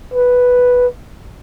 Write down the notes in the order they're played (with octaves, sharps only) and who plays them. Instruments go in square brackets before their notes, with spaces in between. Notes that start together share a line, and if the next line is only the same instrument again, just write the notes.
[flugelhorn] B4